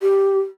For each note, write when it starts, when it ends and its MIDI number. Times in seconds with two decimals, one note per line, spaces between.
0.01 0.39 67